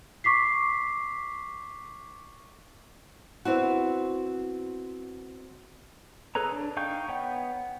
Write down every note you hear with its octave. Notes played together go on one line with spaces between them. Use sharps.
C#6 D6 B6 C7
B3 C4 E4 F#4
G#4 A4 B4 C#5 A#5
D4
D#4 F5 G5 C#6 G6
B3 C#5 F#5 G5